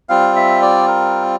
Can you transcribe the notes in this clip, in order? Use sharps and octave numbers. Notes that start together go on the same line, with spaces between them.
G3 C4 F4 F5
E5
D5
A#4